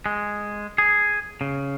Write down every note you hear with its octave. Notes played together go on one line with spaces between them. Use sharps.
G#3
G#4
C#3